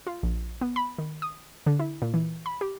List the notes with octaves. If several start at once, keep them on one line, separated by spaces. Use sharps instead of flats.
F4
A#1
B3
B5
D#3
D#6
D3
E4
A#2
E3
B5
G4